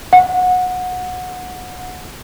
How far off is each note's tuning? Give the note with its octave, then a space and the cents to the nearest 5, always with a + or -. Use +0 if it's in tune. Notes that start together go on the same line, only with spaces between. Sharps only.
F#5 -20